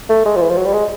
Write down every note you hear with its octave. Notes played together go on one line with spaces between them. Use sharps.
A3
G#3
F3
E3
F3
F#3
G3
G#3